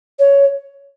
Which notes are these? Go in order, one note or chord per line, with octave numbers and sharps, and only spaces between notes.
C#5